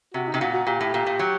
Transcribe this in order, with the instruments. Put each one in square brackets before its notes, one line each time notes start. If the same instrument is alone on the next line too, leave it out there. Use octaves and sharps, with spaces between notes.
[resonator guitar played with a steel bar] C3 [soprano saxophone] F#4
[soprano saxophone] D#4
[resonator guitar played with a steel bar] C3
[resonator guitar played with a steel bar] A#2 [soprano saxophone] F#4
[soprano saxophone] F#4
[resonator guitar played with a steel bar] A#2 [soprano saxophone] G4
[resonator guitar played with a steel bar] A2
A#2
A#2
F#3